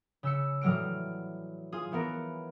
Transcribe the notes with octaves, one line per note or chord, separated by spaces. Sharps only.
C#3 E6 C#7
A2 E3 F#3 G3 F6 D7
F4 G#4 D#6
E3 B3 A#4 D7